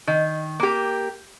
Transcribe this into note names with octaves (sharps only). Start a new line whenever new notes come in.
D#3
A#3 G4